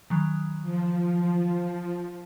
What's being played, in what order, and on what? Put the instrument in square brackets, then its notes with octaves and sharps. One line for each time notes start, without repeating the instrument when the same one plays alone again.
[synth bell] D#3 F#3
[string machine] F3